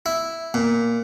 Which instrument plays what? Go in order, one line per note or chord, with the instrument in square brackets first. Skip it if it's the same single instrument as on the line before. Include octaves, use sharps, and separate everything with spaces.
[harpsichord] E4
A#2